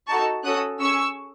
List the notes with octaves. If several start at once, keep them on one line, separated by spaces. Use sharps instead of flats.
D#4 F#4 A4 A5 C#6
C#4 F#4 A4 D#6 F#6
C#4 G#4 C#6 E6